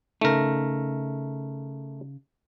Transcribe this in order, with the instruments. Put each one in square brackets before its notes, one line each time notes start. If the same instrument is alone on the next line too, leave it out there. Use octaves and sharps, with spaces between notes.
[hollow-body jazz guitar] C#3 D#4 [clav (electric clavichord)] A3 A#4